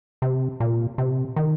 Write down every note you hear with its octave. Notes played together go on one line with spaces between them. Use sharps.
C3
A#2
C3
D#3